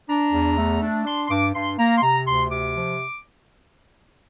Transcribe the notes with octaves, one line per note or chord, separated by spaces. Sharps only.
D4 A#5
E2
A3
D4
D4 C6
C6
G2 D6
G2 C6
A#3 A#5
C6
C3 A#5
D2 C6
C3 D6
F3